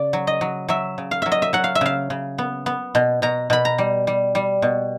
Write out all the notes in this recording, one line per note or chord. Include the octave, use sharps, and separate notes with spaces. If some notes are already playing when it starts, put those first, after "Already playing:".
Already playing: C#3 D5
F#3
D#5
F#3
F#3 E5
C#3
F5
F#3 E5
D#5
E5
F#3 F#5
F5
E5
C#3 F5
C#3
B3
B3
B2
B2 A#5
B2 B5
A#5
G3
G3
G3
B2